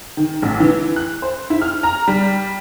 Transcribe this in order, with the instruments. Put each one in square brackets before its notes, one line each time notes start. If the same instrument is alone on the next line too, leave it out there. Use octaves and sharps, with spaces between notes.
[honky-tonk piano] D#3
A1
E3
F#6
C5
E4
F6
A#5
G3